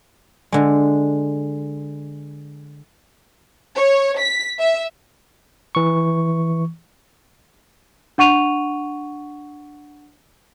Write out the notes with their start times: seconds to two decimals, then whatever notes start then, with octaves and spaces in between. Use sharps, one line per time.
0.52 D3 G#3
3.75 C#5
4.19 B6
4.59 E5
5.75 E3 C#6
8.18 D4 F#5 C#6 D#7 F7